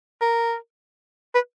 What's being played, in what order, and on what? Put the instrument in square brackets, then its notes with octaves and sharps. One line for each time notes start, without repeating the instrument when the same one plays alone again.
[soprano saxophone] A#4
B4